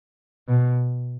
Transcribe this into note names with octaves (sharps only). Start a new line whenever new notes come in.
B2